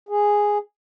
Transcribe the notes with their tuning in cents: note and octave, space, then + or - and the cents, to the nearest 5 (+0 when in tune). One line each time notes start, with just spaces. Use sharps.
G#4 -5